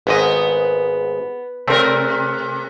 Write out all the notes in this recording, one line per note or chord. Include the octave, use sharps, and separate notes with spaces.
G#1 G#2 B3 D#5
C3 A3 C4 A#4